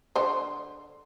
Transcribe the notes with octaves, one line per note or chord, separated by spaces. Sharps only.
D3 C5